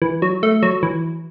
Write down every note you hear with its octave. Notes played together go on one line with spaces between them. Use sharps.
E3
F#3
A3
F#3
E3